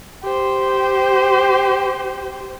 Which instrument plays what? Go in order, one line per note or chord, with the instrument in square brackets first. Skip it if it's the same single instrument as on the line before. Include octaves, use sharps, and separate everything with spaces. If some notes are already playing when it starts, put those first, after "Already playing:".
[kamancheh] G4 C5